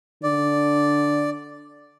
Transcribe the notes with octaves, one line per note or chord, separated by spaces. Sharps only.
D3 D5